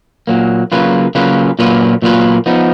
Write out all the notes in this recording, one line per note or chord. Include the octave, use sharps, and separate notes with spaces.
A#2 F#3 A#3
C#3 F#3 A#3 F4 B4
C#3 F#3 A#3 F4 B4
A#2 F#3 A#3 F4 B4
A#2 F#3 A#3 F4 B4
F3 B3 D#4